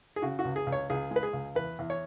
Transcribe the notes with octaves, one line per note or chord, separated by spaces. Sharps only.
G#4
C#3 F#4
F#4
C#2
G#4
C#2
C#5
C#2 G#4
G#3
B4
G#4
C#2
E2 B4
E2
C#5